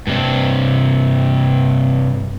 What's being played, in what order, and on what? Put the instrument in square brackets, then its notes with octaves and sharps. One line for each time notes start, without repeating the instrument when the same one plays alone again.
[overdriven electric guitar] G2 C3